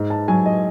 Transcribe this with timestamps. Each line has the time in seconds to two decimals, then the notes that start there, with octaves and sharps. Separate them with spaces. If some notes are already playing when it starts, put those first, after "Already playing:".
Already playing: G#2
0.10 A5
0.28 F#3 G#5
0.46 D#5